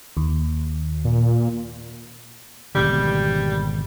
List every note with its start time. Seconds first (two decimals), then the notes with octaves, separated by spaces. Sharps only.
0.17 D#2
1.05 A#2
2.75 G#1 B2 D3 G3